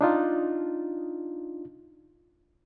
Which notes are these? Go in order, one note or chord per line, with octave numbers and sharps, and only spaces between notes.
D4 D#4 F4